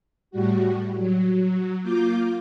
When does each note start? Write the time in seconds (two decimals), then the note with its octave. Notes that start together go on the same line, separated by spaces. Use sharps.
0.31 A2 G3 F#4
0.96 F#3
1.82 A#3 F4 D6 G6